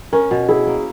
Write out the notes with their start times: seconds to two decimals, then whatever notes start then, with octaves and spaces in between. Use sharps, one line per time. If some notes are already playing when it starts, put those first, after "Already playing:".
0.13 C#4 A#4
0.31 B2
0.48 E4 G#4
0.67 A#3